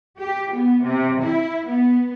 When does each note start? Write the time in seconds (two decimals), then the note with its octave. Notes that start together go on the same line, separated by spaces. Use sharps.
0.20 G4
0.51 B3
0.83 C3
1.22 E4
1.66 B3